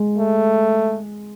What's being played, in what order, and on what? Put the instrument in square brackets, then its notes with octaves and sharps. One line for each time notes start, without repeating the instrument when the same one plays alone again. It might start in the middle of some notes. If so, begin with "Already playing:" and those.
Already playing: [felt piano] G#3
[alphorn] A3